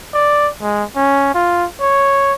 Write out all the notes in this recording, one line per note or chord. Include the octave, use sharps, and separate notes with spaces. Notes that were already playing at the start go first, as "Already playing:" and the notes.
D5
G#3
C#4
F4
C#5